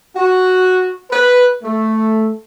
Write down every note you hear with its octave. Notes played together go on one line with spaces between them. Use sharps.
F#4
B4
A3